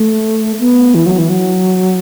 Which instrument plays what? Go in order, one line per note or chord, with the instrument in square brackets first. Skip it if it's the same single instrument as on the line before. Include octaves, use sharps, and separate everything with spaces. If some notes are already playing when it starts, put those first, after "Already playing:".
Already playing: [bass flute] A3
B3
E3
F#3
E3
F#3